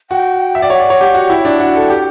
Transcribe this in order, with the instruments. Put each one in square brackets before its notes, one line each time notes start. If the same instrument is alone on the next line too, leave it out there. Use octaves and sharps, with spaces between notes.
[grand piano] F#4 [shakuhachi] G5
[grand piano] E5
D5
[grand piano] C#5 [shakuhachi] F#5
[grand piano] D5
C#5
G4
F#4
[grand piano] E4 [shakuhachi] G5
[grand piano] D4
F#4
A4
G4